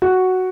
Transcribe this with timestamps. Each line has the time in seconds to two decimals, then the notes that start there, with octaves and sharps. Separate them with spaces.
0.02 F#4